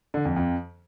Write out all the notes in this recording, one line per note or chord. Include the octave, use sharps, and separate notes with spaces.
D3
F2
F2